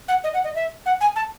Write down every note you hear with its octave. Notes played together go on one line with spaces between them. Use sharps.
F#5
D#5
F#5
D#5
E5
F#5
G#5
A5